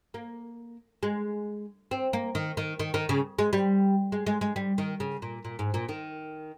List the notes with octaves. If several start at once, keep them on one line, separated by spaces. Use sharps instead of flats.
A#3
G#3
C4
A#3
D#3
D#3
D#3
D#3
C#3
G#3
G3
G#3
G#3
G#3
G3
D#3
C#3
A#2
A#2
G#2
A#2
D#3